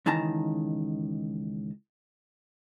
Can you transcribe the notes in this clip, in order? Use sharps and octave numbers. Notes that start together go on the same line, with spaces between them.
C#2 D#3 E3 A5 A#5